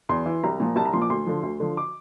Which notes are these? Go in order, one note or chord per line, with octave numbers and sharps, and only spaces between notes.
E2 C6
E3
C2 A#5
A#2 F3
C2 A5
A#5
A#2 F3 C6
D6
D2 C6
D3 F3
D2
D3 F3
D6